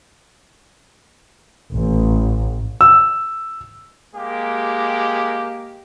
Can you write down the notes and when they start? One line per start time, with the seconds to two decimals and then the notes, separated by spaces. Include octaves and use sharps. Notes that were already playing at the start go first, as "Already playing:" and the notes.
1.75 A1
2.81 E6
4.14 G#3 A#3 G4